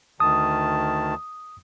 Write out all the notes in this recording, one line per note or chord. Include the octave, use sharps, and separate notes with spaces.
D2 D#3 A5 D#6